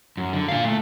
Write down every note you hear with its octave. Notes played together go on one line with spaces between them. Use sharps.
F#2
D3
A#2 F5
A3